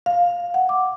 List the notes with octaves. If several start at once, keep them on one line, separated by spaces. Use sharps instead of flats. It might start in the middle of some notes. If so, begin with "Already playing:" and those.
F5
F#5
D6